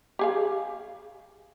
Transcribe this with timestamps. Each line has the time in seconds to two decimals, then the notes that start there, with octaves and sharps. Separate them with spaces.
0.19 G4 G#4 F5